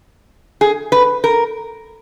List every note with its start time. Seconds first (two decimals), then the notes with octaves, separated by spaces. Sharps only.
0.61 G#4
0.92 B4
1.24 A#4